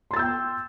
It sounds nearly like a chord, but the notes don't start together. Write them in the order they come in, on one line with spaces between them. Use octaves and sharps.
C6 A6 E6 G6 G5